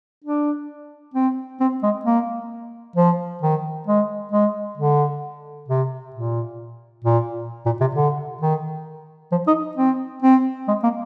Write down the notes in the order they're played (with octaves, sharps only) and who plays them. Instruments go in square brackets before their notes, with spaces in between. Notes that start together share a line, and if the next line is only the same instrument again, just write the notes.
[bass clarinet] D4
C4
C4
G#3
A#3
F3
D#3
G#3
G#3
D3
C3
A#2
A#2
A#2
C3
D3
D#3
F3
D#4
C4
C4
G#3
A#3